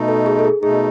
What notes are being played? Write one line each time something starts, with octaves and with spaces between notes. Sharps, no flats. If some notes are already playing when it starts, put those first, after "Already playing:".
Already playing: B2 A3 D#4
A4
G#4
A4
G#4
B2 A3 D#4 G#4